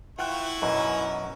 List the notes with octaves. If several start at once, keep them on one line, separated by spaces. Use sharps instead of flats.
E3 E4 F4 F#5 G5 C#6 F#6
B1 F#2 D#4 B4